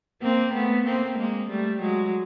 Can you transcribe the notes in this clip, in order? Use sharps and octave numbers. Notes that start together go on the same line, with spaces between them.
A#3 C4
A3 B3
A#3 C4
G#3 A#3
G3 A3
F#3 G#3